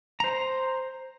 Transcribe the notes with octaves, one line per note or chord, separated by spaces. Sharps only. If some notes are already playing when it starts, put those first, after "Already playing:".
C5 A#5